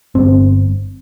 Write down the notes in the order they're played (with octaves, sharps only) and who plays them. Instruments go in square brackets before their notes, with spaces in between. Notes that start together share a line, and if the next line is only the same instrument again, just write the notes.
[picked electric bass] G1 C4